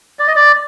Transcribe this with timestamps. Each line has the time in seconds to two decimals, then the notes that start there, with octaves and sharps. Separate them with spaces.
0.19 D5
0.28 D#5
0.36 D5